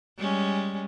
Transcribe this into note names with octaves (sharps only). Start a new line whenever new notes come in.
G3 G#3 C#4